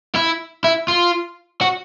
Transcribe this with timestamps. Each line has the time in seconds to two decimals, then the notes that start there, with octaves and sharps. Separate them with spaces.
0.16 E4
0.64 E4
0.88 F4
1.61 F#4